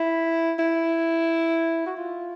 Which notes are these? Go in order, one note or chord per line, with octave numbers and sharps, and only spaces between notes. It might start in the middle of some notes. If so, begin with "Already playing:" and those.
Already playing: E4
E4
F#4
F4